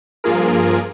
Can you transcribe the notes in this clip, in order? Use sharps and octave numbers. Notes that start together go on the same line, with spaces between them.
G2 F3 A#3 F4 G#4 A#4